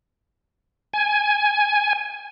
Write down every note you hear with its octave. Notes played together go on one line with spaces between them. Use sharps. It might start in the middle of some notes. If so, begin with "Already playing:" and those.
G#5